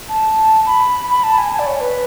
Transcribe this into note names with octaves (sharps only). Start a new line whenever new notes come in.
A5
B5
B5
A5
G#5
G#5
D5
C#5
B4